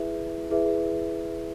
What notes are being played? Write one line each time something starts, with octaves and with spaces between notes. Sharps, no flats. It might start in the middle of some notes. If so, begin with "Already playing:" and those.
Already playing: E4 G#4 B4 E5
E4 G#4 B4 E5